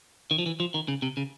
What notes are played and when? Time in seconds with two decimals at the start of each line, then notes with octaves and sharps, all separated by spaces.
0.31 D#3
0.38 F3
0.46 E3
0.60 F3
0.74 D#3
0.88 C#3
1.02 C3
1.17 C#3